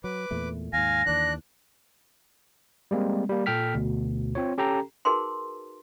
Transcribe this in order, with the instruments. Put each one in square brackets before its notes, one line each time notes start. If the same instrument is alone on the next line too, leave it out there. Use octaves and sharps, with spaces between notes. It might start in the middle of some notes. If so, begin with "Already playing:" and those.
[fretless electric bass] F#3 [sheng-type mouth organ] B4 D6
[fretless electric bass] E2 A#2 A3
[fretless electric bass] D#2 G#2 [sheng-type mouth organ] F5 G#5 [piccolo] A#6
[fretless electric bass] D#2 E3 [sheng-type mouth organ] D4 F#6
[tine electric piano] G3 G#3 A#3 C4
G3 A#3
A#2 A4 G5 F6 B6
D2 B2
C4 F4 C#5
C#4 G4 A4 G5 A#5
[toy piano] D#4 F#4 G#4 A#4 B4 C6